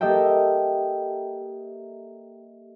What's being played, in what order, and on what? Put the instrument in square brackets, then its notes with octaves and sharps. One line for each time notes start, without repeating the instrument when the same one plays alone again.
[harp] A#3 G4 A4 D#5 E5 G5